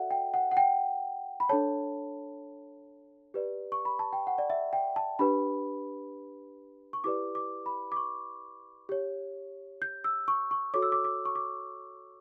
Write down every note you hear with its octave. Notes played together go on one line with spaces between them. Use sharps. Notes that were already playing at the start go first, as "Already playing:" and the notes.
Already playing: F#4 A4 D5 E5 F#5
G5
F#5
F#5
G5
B5
D4 A4 C#5 A5
G4 B4 D5
C#6
B5
A5
G5
F#5
D5
E5
G5
A5
D4 G4 B4 B5
C#6
E4 G4 B4 D5 D6
D6
B5
D6
C#6
G4 C#5
G6
E6
C#6
C#6
F#4 A4 C#5 D6
E6
D6
D6
C#6
D6